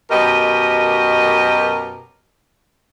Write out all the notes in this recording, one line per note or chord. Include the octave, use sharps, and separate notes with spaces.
F#2 B2 G4 A#4 D#5